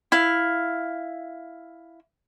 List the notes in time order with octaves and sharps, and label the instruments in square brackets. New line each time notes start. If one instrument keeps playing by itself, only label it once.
[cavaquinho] E4 F5